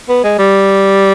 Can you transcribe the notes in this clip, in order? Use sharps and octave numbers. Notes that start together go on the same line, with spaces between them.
B3
G#3
G3